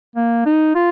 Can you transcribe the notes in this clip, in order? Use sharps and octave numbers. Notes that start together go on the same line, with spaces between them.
A#3
D#4
F4